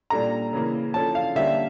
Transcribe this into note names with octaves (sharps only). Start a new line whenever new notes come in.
A#2 G3 D4 A4 A#5
C#3 E3 A#3
F3 C#4 E4 A4 A5
F5
D3 G3 A#3 C#4 G4 E5